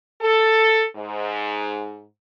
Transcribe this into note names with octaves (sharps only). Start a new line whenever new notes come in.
A4
G#2